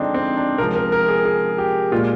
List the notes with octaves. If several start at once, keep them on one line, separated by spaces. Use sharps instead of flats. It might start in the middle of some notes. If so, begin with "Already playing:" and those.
Already playing: D3 F3 G#3 C4 D4 D#4
C4
D4
C3 F3 G#3 A#4
A#4
A#4
G#4
G#4
G4
A#2 G#3 F4